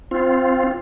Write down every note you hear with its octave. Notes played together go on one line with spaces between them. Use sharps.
C4 F4